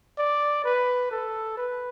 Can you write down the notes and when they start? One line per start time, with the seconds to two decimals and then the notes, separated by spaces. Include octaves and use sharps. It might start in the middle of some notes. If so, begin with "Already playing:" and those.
0.18 D5
0.64 B4
1.11 A4
1.57 B4